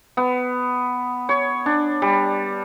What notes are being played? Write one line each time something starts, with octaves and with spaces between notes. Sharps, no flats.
B3
C#5
D4
G3